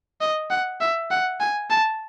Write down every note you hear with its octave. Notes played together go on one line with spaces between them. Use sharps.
D#5
F#5
E5
F#5
G#5
A5